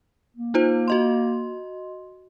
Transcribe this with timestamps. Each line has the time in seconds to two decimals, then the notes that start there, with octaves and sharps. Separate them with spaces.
0.36 A#3
0.54 D#4 F4 C5
0.88 F#4 D#5 C6